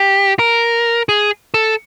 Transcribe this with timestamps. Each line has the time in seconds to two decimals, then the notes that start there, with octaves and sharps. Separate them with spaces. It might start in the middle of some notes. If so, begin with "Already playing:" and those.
Already playing: G4
0.39 A#4
1.09 G#4
1.54 A4